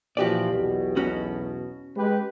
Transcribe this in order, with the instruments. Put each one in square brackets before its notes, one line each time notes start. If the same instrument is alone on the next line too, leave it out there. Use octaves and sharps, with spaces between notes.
[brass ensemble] A#2 E3 F3 [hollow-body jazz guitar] F#4 G4 D5
[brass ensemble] B1 E2 B2
[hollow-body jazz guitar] C#4 F#4
[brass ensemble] G#3 G4 B4